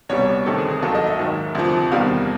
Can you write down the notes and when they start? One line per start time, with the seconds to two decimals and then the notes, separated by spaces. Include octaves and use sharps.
0.09 C2 B2 G3 C#5
0.46 D2 C3 D#3 A4
0.58 G#4
0.70 G#4
0.82 D#2 D#3 F#3 A4
0.95 D#5
1.06 E5
1.19 G#2 D#3 F#3
1.55 D2 C3 F3
1.92 E2 C3 D#3 G3 F5